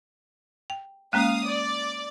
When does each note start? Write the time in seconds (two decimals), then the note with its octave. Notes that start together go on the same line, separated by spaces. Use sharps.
0.70 G5
1.13 G#3 A#3 C#4 F5 D#6
1.46 D5